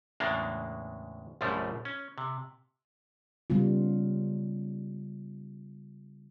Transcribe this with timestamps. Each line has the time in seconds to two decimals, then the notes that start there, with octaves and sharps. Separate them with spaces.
0.20 E2 A2 C#3 G#3 A#3 D4
1.41 A#1 F#2 C#3 F3 G3 A3
1.85 C#4
2.18 C3
3.50 C#3 G3 B3 F4